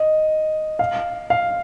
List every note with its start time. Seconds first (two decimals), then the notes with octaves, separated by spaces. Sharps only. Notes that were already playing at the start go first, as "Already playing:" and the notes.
Already playing: D#5
0.79 F5
1.30 F5